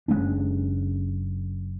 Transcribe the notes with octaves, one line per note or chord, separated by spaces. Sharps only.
F#1 G#3 C#4 D4